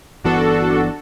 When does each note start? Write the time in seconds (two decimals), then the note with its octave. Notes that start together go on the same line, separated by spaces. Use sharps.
0.24 G1 E3 B3 D4 F#4 A4